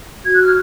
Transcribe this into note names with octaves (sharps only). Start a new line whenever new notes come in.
F#4 G#6
F#6
F6